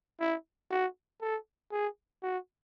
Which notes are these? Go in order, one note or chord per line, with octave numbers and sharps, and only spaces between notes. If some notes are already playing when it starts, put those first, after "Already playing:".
E4
F#4
A4
G#4
F#4